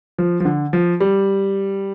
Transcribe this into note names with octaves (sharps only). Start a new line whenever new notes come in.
F3
F3
D3
F3
G3